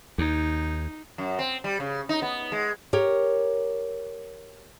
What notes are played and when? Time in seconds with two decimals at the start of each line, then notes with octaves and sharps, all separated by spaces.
0.18 D#2 D#4
1.18 F#2
1.39 C4
1.64 G3
1.80 C#3
2.09 D#4
2.22 B3
2.52 G#3
2.93 G4 A#4 C#5